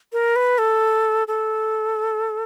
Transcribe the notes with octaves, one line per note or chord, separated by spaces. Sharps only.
A#4
B4
A4
A4